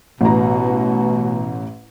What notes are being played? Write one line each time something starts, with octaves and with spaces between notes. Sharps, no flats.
A1 B2 A#5